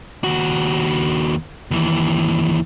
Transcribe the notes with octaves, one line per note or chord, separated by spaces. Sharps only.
D#2 F#4
D#2 E3